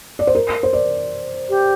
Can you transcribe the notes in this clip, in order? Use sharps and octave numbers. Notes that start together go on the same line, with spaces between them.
D5
C5
A#4
C5
D5
G4